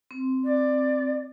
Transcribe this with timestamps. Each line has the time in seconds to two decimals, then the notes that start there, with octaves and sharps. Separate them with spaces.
0.11 C4
0.44 D5